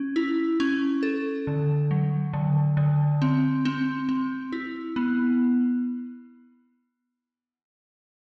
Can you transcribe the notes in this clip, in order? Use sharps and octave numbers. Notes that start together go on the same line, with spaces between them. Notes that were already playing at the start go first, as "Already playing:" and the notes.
Already playing: C#4
E4
C#4
A4
D3
F#3
D3
D3
C4
C4
C4
E4
B3